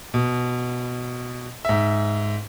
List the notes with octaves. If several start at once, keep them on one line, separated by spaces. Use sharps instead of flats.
B2
G#2 E5